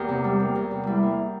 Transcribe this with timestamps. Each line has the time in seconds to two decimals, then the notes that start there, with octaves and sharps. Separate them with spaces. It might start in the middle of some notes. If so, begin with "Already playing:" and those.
Already playing: E2 A#3 G4
0.09 C3
0.24 G3
0.40 A#3
0.55 E2
0.71 C3
0.86 G3 E4
1.03 A#3